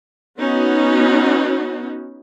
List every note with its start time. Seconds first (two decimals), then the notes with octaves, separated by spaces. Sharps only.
0.39 B3 C#4 D#4 F#4